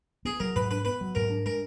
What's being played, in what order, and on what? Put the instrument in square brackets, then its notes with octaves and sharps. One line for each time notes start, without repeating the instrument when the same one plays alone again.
[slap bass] B3 [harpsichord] G#4
[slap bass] F#3 [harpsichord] A#4
[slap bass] G#2 [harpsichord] B4
[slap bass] D4 [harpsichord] B4
[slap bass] B3 [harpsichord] B4
[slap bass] F#3
[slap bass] G#2 [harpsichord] A#4
[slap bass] D4
[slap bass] G#3 [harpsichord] A#4